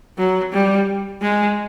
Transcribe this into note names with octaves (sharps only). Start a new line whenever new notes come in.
F#3
G3
G#3